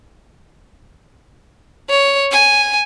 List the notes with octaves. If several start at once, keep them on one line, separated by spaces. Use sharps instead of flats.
C#5
G#5